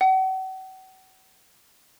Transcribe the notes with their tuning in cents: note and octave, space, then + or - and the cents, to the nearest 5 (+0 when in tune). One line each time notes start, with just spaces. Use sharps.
F#5 +40